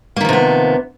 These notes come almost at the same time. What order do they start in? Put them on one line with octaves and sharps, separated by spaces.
A#3 D#3 F3 C3 B3